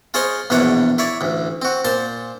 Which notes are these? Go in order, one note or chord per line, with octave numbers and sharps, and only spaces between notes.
F4 G#4 C5 C#5 D#5 F5
A#1 E2 B2 D4 C#5 F#5
E4 C#5 D5
A1 D2
C4 F#4
A#2 C5 A5